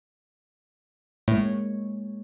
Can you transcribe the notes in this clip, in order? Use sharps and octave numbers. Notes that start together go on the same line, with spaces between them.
A2 G#3 A#3 C#5